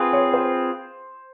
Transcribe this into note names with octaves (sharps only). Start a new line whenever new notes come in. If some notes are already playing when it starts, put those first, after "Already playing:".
Already playing: C4 F4 G#4 B4
C#5
C5